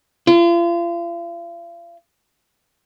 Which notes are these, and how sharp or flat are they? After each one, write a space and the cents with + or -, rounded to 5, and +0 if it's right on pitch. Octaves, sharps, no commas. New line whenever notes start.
F4 -40